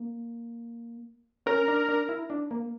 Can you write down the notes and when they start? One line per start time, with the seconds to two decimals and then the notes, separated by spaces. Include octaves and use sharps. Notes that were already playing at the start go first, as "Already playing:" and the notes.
Already playing: A#3
1.46 C#4 A#4
1.68 D4
1.88 D4
2.09 E4
2.30 D4
2.51 A#3